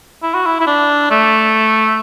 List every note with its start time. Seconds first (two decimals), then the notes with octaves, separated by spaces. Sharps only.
0.23 E4
0.34 F#4
0.46 E4
0.60 E4
0.67 D4
1.11 A3